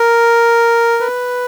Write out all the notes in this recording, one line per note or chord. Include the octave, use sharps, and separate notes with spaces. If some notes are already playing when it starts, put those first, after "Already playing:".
Already playing: A#4
B4